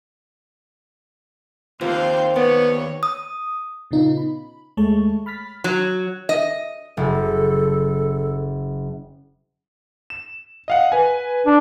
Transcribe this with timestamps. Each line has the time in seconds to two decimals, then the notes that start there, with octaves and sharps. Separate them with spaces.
1.81 D#2 F3 A#3 C4 C5 F5 G5
2.36 B3 C#5 D5
3.03 D#6
3.91 A#2 C#3 B3 D#4 F4
4.17 B5
4.77 D#2 G#3 A3 C#5 A5 C#6
5.26 B5 F6 A6 B6
5.64 F#3
6.29 D#5
6.97 F#1 A4
10.10 E7
10.68 D#5 F5 F#5
10.92 B4 G#5
11.46 D4